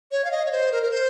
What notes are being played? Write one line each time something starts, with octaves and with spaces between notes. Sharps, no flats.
C#5
F5
D#5
C#5
C5
A#4
A#4
C5